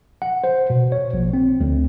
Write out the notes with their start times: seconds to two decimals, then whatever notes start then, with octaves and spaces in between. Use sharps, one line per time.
0.22 F#5
0.44 C5
0.70 B2
0.92 C#5
1.13 A#1
1.33 C4
1.60 D2